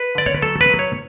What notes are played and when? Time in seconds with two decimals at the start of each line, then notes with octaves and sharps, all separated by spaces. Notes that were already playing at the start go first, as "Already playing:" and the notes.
Already playing: B4
0.15 D3 D5
0.26 C#5
0.34 B4
0.42 F#3 A4
0.61 B4
0.70 F#3
0.79 C#5